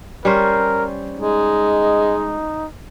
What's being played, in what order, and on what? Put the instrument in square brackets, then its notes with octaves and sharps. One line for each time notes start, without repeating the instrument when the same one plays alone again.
[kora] G3 C#4 C5 [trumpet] A#4
[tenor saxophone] G#3 [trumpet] D#4